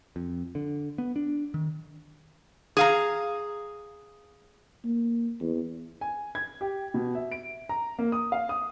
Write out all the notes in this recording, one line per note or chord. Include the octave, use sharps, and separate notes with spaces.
F2
D3
B3
D4
D#3
G#4 F5 A#5
A#3
E2
G#5
G#6
G4
B2
E5
D7
A#5
A#3
D#6
F5
D#6